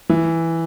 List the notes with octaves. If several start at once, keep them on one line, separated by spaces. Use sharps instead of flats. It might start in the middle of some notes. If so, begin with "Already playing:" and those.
E3